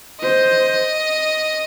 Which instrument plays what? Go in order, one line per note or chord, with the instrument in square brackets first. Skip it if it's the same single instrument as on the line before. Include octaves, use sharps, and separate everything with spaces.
[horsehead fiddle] C5 [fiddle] D#5